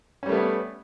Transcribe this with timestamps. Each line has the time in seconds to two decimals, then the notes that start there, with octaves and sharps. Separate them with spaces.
0.23 C#4
0.26 G3
0.29 A3
0.32 B3